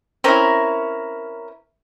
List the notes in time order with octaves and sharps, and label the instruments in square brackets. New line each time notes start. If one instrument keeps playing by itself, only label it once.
[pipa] C4 E4 [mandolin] C#4 A#4